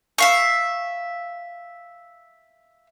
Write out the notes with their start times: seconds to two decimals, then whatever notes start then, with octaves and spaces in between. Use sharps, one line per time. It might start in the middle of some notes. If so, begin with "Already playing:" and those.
0.18 E5 F5 C#6